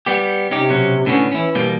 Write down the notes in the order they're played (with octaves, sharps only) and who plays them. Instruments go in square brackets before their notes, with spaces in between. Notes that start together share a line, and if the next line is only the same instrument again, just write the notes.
[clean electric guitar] G3 B3 G4
[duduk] C3 [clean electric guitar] C#4 D#4 G4
[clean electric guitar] B2 F#3 C#4
[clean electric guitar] A2 D3 B3 [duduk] C#4
[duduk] E3 [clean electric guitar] C#4 E4
[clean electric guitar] B2 G3 A#3